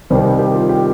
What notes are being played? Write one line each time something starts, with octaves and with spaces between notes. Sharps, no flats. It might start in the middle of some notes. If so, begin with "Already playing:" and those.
C2 C3 D#3 G3 C5
G4
G4
F4
G4